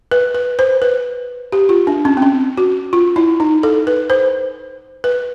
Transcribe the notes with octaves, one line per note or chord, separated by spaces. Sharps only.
B4
B4
C5
B4
G4
F4
D4
C#4
C4
C#4
F#4
F4
E4
D#4
A4
B4
C5
B4